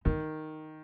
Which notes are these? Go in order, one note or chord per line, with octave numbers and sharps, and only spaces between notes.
D#3 D#4